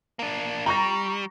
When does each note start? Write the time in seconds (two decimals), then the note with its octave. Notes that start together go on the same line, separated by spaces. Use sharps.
0.19 A#3 D4
0.66 G3 A#5 C#6 A#6